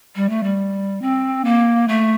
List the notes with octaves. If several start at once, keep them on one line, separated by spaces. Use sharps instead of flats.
G3
A3
G3
C4
A#3
A3